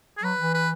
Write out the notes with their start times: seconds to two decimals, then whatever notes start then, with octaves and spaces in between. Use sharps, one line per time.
0.18 G#4
0.23 F#3 B4
0.39 E3
0.54 B4